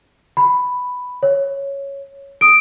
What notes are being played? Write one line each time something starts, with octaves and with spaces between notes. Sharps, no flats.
B5
C#5
D#6 D7